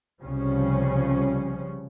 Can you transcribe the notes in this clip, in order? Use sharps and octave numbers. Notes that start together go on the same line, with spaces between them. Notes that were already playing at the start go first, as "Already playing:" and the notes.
C2 C#3 F3 G3 C#4